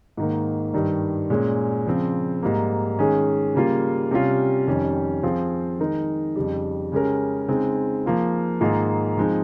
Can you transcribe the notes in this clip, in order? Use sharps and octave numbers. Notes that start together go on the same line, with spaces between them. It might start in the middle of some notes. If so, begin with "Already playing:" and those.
G#2 D#3 A#3
G2 D#3 G3
A#2 G#3 C#4
C#3 F3 C4
G#2 G3 A#3
D#3 G#3 C#4 G#4
C#3 G3 A#3 F4
C3 G3 C#4 F4
F2 D#3 G3 C#4 G4
F3 C4 F4 G#4
D#3 G#3 D#4 A#4
F2 C#3 G3
C#3 G#3 C#4 G4 A#4
C#3 G#3 C4 D#4 G#4
F3 A#3 F4 G#4
G#2 D#3 A#3 F4 G#4
F3 G#3 C4 D#4